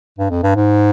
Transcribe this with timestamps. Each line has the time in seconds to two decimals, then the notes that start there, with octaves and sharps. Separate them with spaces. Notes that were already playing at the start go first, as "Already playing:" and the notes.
0.19 G2
0.30 F2
0.43 G2
0.56 G#2